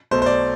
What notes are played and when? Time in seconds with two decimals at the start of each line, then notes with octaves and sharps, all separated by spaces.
0.11 B1 B2 A3 C5
0.22 C5
0.26 D5